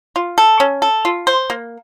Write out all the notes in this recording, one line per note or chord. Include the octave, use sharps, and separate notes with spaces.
F4
A4
C#4
A4
F4
C5
A#3